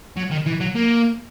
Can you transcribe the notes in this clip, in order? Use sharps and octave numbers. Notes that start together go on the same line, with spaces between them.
F#3
D#3
E3
F#3
A#3